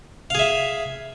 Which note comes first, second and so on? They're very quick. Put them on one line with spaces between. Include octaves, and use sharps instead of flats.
F5 G#4 E5